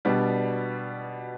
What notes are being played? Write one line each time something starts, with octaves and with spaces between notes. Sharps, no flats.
B2 G3 B3 D4